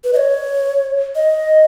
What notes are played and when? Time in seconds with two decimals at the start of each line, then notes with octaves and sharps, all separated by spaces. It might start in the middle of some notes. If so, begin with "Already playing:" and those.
0.04 B4
0.13 D#5
0.17 C#5
1.15 D#5